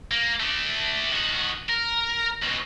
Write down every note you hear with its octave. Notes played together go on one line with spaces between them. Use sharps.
A#3
A3 D4
D#3 F#4
A#4
C#2 B2